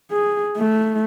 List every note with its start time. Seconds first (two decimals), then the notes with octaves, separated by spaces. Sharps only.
0.11 G#4
0.57 A3